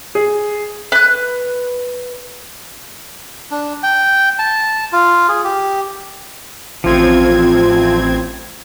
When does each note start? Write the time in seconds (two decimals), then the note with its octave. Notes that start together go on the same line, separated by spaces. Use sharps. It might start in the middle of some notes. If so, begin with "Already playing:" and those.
0.15 G#4
0.92 B4 F#6
3.51 D4
3.83 G5
4.39 A5
4.92 F4
5.29 G#4
5.44 G4
6.84 A1 F3 C4 G#6